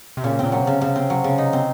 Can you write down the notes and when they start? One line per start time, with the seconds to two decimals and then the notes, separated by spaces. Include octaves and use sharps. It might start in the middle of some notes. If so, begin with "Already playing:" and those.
0.17 C3
0.24 A#2 C#3
0.39 A#2 C4
0.52 F#3
0.62 C3
0.67 C#3
0.81 C#3
0.96 C4
1.10 F#3
1.24 C#3
1.38 D#4
1.53 C4